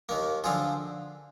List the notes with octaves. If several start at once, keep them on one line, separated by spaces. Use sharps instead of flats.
D#2 D#3 A#3
D3 F3 C4 F4 G#4